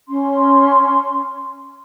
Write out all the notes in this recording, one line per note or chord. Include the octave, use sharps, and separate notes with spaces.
C#4 C6